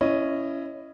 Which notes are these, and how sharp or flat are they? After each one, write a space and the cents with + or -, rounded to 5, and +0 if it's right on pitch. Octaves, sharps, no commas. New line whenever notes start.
C#4 +0 E4 +15 D#5 -10